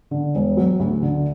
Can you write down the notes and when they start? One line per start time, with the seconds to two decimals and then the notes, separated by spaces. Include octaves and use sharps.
0.11 D3
0.35 E1
0.57 F#3
0.79 D2
1.02 D3